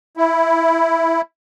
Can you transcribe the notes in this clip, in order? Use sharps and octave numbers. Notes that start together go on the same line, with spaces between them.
E4